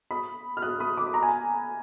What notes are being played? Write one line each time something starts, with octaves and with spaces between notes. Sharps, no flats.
B5 D#6
F6
D#6 F#6
B5 D#6
D6
B5
A#5
G#5 B5